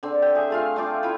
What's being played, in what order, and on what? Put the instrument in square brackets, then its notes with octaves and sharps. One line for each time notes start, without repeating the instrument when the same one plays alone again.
[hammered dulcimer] D3 C4
G5
G#4 E5
A3 F4 F5
A3 F4 G5 D6
E4 F4